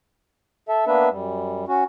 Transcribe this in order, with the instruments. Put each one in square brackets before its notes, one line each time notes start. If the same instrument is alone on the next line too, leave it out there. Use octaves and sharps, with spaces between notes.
[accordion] A4 E5
A#3 B3 D4 B4 E5
F#2 G3
C#4 F#4